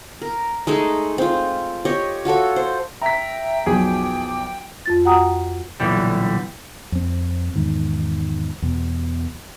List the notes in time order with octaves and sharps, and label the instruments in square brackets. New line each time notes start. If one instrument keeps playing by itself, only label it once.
[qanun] A#4
G#3 A3 D#4 G#4
C4 F4
G4 C#5 D#5
F4 F#4 A4 C#5
C5
[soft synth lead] E5 [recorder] G5 [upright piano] A#5 B6
[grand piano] B1 F2 B2 [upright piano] G#4 [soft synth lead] D6
[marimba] F2 F4 A6
F#4 F#5 G5 A#5 D#6
[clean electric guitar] B1 F#2 A#2 D3 E3 G3
[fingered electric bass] F2 C4
E2 G#2 D#3
E2 B2